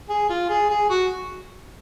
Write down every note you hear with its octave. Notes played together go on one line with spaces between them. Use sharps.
G#4
F4
G#4
G#4
F#4